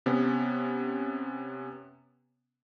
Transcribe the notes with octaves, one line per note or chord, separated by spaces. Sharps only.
C3 B3 C#4